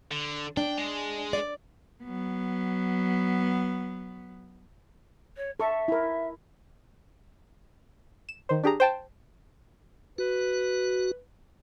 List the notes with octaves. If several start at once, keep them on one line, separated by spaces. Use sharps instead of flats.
D3
D4 G5
G#3
D5
F#3 B3
C#5
A4 E5 C#6
E4 A#4
E7
D#3 C5
D4 G4 G#4 A#5
C5 G5 A5
F#4 B4